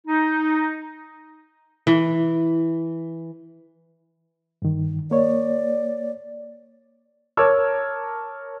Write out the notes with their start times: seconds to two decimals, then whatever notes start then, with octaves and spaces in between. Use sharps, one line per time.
0.07 D#4
1.87 E3
4.62 G2 D#3
5.11 A#3 C#5 D5
7.37 A#4 C#5 A5 D6 E6 F6